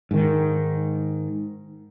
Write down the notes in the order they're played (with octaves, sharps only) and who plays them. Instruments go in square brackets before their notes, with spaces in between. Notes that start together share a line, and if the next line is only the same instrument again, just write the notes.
[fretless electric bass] G#2 D#3